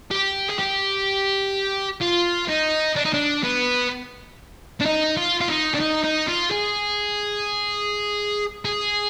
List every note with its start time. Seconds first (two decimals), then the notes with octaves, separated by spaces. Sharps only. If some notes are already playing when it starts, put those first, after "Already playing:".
0.11 G4
0.50 G#4
0.59 G4
2.01 F4
2.48 D#4
2.96 D4
3.05 D#4
3.14 D4
3.44 B3
4.81 D4
4.86 D#4
5.17 F4
5.41 F4
5.49 D#4
5.74 D4
5.80 D#4
6.04 D#4
6.28 F4
6.51 G#4
8.65 G#4